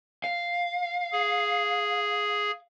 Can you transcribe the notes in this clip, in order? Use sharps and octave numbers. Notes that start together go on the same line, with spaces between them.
F5
G#4